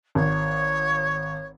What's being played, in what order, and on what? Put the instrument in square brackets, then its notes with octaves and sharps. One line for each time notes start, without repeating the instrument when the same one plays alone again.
[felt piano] G#1 [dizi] C#5